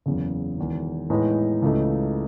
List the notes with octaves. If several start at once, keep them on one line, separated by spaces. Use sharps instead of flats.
F#1 E2 C#3
E1 E2 D#3
A2 E3 G#3 B3 D#4
C#2 C#3 E3 A3 D#4